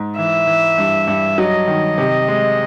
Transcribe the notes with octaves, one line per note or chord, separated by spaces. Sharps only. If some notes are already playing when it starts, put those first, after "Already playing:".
Already playing: G#2
E3 E5
E3
G2
G2
F#3 D#5
D#3
C3
G#3